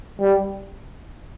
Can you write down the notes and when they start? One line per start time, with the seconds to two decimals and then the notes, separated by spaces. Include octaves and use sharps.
0.20 G3